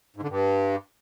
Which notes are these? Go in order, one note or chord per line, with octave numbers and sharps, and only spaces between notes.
G#2
D3
G2